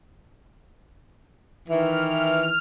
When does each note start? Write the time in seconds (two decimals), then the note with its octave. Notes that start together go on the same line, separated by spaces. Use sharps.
1.68 D#3 E3 F6